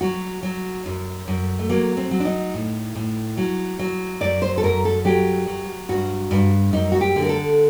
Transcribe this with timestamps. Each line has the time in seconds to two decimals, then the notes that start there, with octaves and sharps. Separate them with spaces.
0.01 F#3 F#4
0.43 F#3
0.86 F#2
1.28 F#2
1.59 A3
1.69 F#3 A#3
1.97 C4
2.11 F#3
2.20 D4
2.25 D#4
2.54 A2
2.95 A2
3.37 F#3
3.79 F#3
4.21 F#2 D5
4.42 C5
4.58 A4
4.63 F#2 A#4
4.85 A4
5.05 F#3 G4
5.47 F#3
5.89 G2 F#4
6.31 G2
6.73 F#2 D#4
6.92 F#4
7.01 G4
7.16 D3
7.22 A#4
7.29 A4